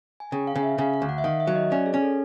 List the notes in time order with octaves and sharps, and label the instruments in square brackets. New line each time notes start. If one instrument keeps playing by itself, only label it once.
[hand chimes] G#5
[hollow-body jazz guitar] C#3 [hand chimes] G5
[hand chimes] F5
[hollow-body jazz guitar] C#3
[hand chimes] E5
[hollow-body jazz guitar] C#3 [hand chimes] F5
[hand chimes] F5
[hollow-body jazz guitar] D2
[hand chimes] F#5
E5
[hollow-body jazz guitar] D#3 [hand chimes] F5
[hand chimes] E5
[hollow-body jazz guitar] F#3
[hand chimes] D#5
[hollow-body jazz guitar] C#4 [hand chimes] D5
[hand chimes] G#4
[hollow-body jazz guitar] C#4
[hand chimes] A4